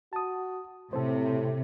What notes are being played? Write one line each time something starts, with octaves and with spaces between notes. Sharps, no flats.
F#4 A5 D#6
A2 C3 A4 C5